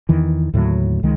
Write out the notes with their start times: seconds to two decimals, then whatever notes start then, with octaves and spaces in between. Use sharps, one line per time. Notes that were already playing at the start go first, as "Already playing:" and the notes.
0.09 E2 D#3 E3
0.54 D#2 A2 D3 F#3
1.03 C#2 D#3 G#3